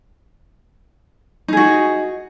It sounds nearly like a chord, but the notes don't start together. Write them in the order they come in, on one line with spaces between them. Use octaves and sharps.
D#4 G#4 F#4